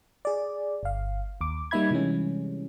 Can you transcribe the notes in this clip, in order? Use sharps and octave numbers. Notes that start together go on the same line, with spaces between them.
G#4 D5
G1 F5
D#2 D6
G3 A#3 D#4 E5 B5 G#6
C3 E3 G3 G#3 C#4